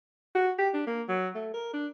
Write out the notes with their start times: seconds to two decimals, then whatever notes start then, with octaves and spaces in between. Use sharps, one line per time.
0.35 F#4
0.58 G4
0.74 D4
0.87 A#3
1.09 F#3
1.35 A3
1.54 A#4
1.74 D4